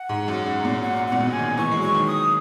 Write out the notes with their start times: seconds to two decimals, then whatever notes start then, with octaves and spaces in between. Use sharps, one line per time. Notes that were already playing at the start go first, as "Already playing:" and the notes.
Already playing: F#5
0.09 G#2
0.28 F#2
0.46 G#2
0.65 A#2
0.83 F#5
1.08 A#2 F#5
1.20 B2
1.32 G#5
1.39 D#3
1.57 E3 C#6
1.72 G#3
1.76 F#3
1.82 C#6
1.95 D#3
2.07 D#6